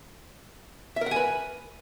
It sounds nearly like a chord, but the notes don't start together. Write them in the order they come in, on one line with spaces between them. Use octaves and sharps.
E5 A#4 F#5 G#5 B4